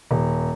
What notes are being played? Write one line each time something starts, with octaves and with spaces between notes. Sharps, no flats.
D#1